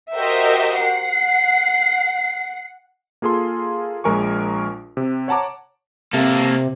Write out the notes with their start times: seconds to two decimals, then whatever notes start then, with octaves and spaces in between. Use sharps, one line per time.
0.16 F#4 G4 A#4 C5 D#5 E5
0.78 F#5 C7
3.22 A#3 F4 G#4 A4 C6
4.04 A#1 G#3 A#4 G#5 C#6
4.97 C3
5.28 C#5 F#5 A5 A#5 D6
6.13 C3 A#3 A4